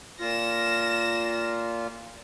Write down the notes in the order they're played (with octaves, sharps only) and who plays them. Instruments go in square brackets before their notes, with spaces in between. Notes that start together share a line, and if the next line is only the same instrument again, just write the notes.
[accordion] A#2 F4 [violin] A#6 E7